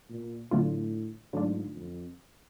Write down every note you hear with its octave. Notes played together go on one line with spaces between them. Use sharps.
A#2
A2 D3 F#3 A3 D4 F4
G#2 D3 F#3 A3 D4 F4
F2